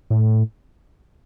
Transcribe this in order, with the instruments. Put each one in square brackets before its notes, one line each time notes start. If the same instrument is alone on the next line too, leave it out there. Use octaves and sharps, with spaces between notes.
[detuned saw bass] A2